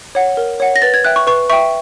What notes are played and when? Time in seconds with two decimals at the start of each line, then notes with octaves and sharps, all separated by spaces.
0.15 C#5 F#5
0.37 A#4
0.60 C#5 F#5
0.76 A#6
0.82 B4 A6
0.94 G#6
1.04 E5 G5 F#6
1.16 C#6
1.27 B4 C#6
1.50 E5 G5 C#6